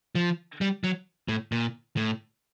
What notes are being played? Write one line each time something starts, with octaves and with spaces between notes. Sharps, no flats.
F3
G3
F#3
A2
A#2
A2